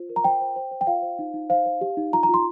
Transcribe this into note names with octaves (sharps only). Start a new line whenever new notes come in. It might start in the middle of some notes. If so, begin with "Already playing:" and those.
Already playing: F4 C5
A#4
A#5
C5 G5
C5
C5
C5
G5
F4 F5
C5
D#4
D#4
C5 F5
C5
G4
D#4
F4 A#5
A#5
F4 C6